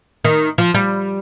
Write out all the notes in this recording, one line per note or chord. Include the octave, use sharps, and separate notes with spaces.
D#3
F3
G3